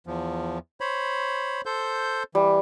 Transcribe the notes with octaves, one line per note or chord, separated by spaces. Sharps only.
E2 F3
C5 C#5 B5
A4 C5 G6
E3 G3